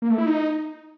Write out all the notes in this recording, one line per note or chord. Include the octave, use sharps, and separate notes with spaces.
A#3
A3
E4
D#4